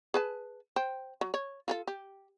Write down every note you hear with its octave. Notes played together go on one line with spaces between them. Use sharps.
G#4 B4 A5
C5 G5
F#3
C#5
F4 G#4 A4
G4